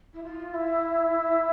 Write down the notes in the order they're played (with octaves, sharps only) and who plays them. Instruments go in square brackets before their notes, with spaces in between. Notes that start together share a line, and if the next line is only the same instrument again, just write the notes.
[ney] E4
F4
E4